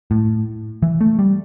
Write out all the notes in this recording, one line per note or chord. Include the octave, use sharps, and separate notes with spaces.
A2
E3
A3
G3